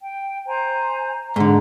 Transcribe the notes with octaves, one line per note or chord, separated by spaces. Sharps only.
G5
C5 G#5 A#5
G#2 D3 A#5